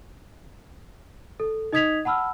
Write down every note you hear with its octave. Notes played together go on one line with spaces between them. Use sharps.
A4
D#4 D#5 D#6 G#6 B6 F7
F#5 A5 B5 E6 F6